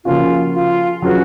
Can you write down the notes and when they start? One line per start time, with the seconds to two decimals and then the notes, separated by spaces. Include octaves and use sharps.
0.05 C#3 F3 A#3 C#4 F4 F#4
0.54 F4
1.02 F#3 C#4 F4 F#4 G#4 B4